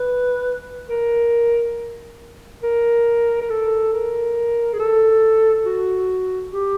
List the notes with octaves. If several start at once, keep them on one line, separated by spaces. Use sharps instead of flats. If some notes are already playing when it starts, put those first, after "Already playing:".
Already playing: B4
A#4
A#4
A#4
A4
A#4
G#4
A4
F#4
G4